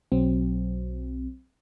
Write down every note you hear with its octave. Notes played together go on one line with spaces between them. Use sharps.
B1 F#3 C4